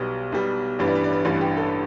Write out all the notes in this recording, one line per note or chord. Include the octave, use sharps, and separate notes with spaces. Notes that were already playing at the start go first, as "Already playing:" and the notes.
Already playing: B1 B2 G3
B1 B2 G3
A1 G2 E3 G3 B4
D5
B4
D5
B4
A1 G2 E3 G3 B4
G4
A4